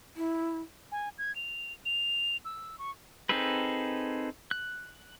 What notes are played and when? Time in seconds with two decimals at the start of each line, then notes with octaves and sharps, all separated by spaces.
0.17 E4
0.92 G#5
1.18 G#6
1.36 F7
1.85 F7
2.45 E6
2.79 C#6
3.29 C4 D#4 G#4 A4 B4
4.51 F#6